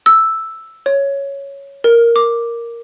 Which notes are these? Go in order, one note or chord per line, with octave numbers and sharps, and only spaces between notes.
E6
C#5
A#4
D6